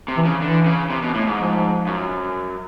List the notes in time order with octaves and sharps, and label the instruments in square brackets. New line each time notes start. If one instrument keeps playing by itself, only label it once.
[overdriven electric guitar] C3
[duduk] E3
[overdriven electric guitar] C#3
[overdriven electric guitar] D3 [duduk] E3
[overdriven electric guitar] C#3
C3
B2
A2
G#2
[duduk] F3
[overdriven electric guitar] F#2